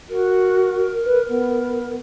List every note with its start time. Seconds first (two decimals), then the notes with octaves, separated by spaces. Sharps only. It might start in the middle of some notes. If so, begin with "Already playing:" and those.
0.09 F#4 A#4
1.05 B4
1.29 B3